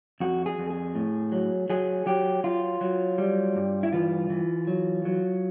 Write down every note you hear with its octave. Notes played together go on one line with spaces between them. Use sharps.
F2 F#4
G#4
F2
G#4
A2
F#3
F#3 G#4
F#3 G4
F#3 F4
F#3
G3
G2
E4
E3 F4
E3
F#3
F#3